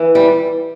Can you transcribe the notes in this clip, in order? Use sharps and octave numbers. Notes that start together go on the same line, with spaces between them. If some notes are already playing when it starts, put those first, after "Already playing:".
Already playing: E3
G3